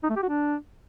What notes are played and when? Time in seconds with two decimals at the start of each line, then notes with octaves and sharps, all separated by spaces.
0.03 D#4
0.10 A3
0.16 G4
0.23 F#4
0.29 D4